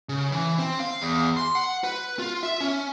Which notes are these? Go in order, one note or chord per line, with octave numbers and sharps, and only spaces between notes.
C#3
E3
C4
F5
E2
C6
F#5
B4
F4
E5
C#4